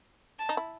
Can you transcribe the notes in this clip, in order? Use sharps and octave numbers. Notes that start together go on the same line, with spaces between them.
A5
D#4
E4